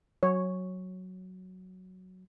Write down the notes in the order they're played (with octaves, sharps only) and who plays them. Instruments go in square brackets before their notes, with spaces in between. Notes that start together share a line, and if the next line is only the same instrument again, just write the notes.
[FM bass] F#3 [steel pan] C#5